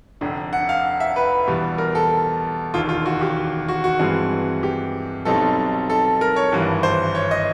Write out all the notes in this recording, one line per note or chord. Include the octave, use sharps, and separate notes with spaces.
F1 F2 D3
F#5
F5
E5
B4
E2 B2 G3
A#4
A4
E1 D#2 D#3 F4
F4
F#4
G4
F#4
F#4
G2 E3 G#3 C4
G4
B1 B2 G3 C4 D#4 A4
A4
A#4
C#5
G#1 G2 E3 G3
C5
C#5
D#5